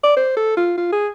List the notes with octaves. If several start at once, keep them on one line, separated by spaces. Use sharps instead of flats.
D5
C5
A4
F4
F4
G#4